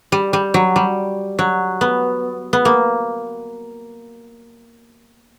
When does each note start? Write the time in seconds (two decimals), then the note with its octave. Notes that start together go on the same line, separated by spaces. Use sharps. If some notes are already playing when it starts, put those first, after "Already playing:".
0.12 G3
0.33 G3
0.54 F#3
0.76 G3
1.39 F#3
1.81 B3
2.53 B3
2.65 A#3